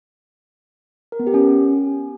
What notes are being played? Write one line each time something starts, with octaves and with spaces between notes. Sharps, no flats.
A#4
B3
G4
C#4